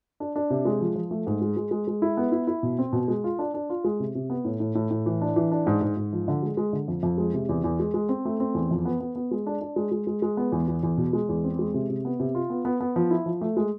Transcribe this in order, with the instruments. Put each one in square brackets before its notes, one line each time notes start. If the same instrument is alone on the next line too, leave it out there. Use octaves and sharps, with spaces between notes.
[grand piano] D4
D4
C3
G#3
F3
F3
A3
G#2
G#3
G#3
G#3
G#3
E4
B3
E4
E4
B2
C4
B2
G#3
F4
D4
D4
F4
G#3
C3
C3
B3
A2
A2
A2
A2
E3
D4
E3
D4
G#2
G#2
G#2
F3
D3
G#3
G#3
D3
F2
F2
G#3
C3
E2
E2
G#3
G#3
C4
A3
C4
E2
F2
B3
B3
B3
G#3
D4
D4
G#3
G#3
G#3
G#3
B3
E2
E2
E2
B2
G#3
E2
C4
G#3
C3
C3
B3
C3
F4
B3
B3
B3
F3
E4
F3
A3
G#3